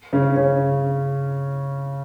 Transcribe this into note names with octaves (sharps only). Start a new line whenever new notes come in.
C#3 C#4
C#3 C#4